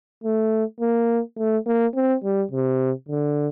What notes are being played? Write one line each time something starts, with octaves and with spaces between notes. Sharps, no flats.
A3
A#3
A3
A#3
C4
G3
C3
D3